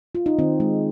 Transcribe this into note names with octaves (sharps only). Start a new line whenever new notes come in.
F4
D#4
D#3 C4
G#3